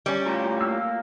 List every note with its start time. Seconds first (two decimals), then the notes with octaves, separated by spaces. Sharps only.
0.06 G3 C#4
0.26 A2 F4 A#5
0.61 A#3 F5 E6